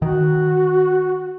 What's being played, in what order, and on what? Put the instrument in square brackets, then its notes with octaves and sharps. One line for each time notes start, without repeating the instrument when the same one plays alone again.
[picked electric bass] D#3 [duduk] F#4